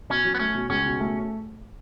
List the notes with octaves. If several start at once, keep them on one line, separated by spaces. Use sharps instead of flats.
B2 C#4
F#3
B3
A3 C#4
B2
C#2 C#4
B2
A3